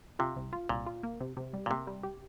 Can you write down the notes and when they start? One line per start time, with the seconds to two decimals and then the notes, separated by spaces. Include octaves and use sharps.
0.19 C3 F4
0.36 C2
0.53 F4
0.69 C2 A#2
0.86 F4
1.03 A#3
1.20 C3
1.37 C3
1.53 G3
1.66 A#2
1.70 C3 A#3
1.87 G3
2.03 G4